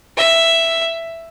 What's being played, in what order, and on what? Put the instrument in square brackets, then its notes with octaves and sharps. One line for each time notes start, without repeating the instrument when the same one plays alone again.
[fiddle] E5